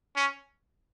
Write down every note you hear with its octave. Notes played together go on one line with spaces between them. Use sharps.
C#4